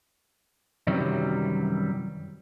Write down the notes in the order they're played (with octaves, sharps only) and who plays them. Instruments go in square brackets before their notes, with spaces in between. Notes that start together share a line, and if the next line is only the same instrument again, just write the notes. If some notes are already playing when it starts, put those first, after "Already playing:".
[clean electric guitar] F#2 C3 D#3 E3 F#3 G3